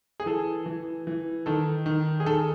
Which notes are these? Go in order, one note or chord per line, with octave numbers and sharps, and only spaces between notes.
G#4
E3 A4
E3
E3
D#3 A4
D#3
G#4
D#3 A4